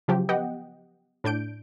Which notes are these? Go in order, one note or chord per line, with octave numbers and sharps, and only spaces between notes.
C#3 F3 F#3 G4
B3 G4 D#5 F#5 G5
A2 D4 G6 D7